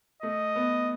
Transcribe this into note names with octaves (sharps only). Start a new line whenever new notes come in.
A3 D#5
B3